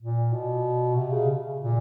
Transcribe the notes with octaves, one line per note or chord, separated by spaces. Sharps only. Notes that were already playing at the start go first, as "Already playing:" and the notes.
A#2
B2
C3
C#3
A#2